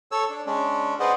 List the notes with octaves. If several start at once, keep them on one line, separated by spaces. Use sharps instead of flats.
A4 C#5 E6
D4
G#3 C#4 D4
G#4 B4 C5 D5 D#5 F#5